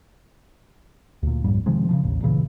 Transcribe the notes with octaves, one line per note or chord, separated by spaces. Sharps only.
D2 A#2
A#1 F2 G#2 G3
C3 D#3 F3 G#3
C#3 E3 F3
A1 D#2
D1 A#2 C#3 E3